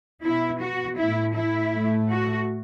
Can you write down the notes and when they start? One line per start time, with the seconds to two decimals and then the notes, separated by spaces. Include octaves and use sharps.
0.25 B2 B3 E4
0.61 F#4
0.98 A2 A3 E4
1.35 E4
1.72 A2 A3
2.09 F#4